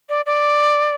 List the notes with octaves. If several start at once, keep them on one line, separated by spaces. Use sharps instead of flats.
D5
D5